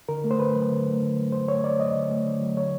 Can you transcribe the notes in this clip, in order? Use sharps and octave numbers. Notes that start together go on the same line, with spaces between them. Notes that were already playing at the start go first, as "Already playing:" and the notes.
D3 A#4
A3
C5
D3 B4
F#3
D3
A3
D3
F#3
D3 C5
A3 C#5
D3 D5
F#3 D#5
D3
A3
D3
F#3
D3 C#5